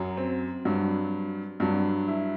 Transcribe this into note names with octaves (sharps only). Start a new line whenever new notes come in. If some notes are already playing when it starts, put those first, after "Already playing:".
Already playing: F#2 F#3
C4
G2 F#3
G2 F#3 D4
E4